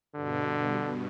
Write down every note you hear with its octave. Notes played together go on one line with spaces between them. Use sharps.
G2 B2 D3